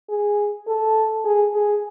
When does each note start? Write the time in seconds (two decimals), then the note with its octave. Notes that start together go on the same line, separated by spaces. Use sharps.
0.09 G#4
0.67 A4
1.25 G#4
1.54 G#4